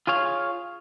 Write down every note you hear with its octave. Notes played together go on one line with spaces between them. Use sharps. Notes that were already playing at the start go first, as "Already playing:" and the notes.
F4 G#4 C#5 F5